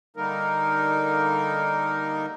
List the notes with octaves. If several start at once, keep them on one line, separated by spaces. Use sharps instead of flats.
D3 G3 A#3 D#4 A#4